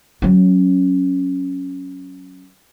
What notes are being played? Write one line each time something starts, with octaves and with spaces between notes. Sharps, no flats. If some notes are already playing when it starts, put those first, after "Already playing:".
F#3 C#4